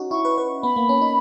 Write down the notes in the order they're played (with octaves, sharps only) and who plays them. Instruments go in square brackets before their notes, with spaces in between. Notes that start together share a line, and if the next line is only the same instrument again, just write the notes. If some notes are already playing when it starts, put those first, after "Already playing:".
Already playing: [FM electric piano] C#4 D#4 F#4
[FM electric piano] E4 [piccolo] C#6
[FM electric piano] B4
B4
[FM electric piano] B3 [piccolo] B5
[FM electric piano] A#3
C#4
D#4